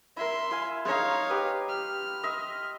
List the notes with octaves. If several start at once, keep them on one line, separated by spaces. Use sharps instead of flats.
E4 A#4 E5 C6
E4 F5 G#5
G#3 D#4 C#5 F5
G4 B4 D#5
F6
D#5 E5 C6